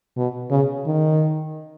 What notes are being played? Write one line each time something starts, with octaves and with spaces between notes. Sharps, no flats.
B2
C#3
D#3